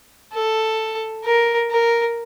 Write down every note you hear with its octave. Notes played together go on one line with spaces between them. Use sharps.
A4
A#4
A#4